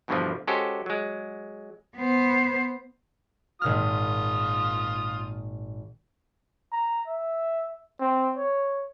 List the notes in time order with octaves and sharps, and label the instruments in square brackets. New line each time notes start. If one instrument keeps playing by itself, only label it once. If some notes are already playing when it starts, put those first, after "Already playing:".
[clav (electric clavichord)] E2 G2 B2 D3 E3 F3
G#3 C#4 F#4 G4 A4 C5
F#3 G#3
[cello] B3 C5
[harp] G#1 A#2 F6 [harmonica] F4 D#6
[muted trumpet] A#5
E5
C4
C#5